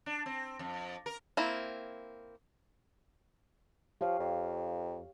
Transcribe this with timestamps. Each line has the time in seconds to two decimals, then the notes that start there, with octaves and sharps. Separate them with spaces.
0.06 D4
0.26 C4
0.59 F2
1.06 A#4
1.37 A#3 C4 E4
4.01 F3 G4 C#5 F5
4.20 F2